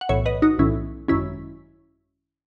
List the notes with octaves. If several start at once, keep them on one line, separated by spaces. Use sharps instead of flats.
F#5
B1 A2 E3 C#5 E5
B4 D#5
D#4 F#4
B1 A2 E3 C#4 E4
G#1 F#2 D#3 C#4 E4